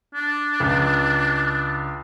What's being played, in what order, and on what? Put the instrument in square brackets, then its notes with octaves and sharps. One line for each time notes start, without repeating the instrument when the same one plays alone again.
[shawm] D4
[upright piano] C#2